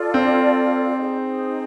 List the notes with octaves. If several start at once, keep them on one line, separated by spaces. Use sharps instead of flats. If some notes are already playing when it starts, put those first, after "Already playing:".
Already playing: F4 A4 D5
C4
D#4 G#4 C5